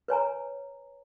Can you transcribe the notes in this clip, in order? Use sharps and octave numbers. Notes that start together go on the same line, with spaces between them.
B4 C#5 G#5 A#5